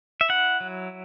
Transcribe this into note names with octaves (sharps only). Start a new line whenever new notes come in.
E5
E4 F#5
F#3